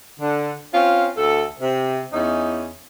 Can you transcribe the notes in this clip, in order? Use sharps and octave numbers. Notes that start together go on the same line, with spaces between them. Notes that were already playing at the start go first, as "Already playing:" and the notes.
D3
C4 C#4 F4
D2 A4
C3
E2 C#4 D#4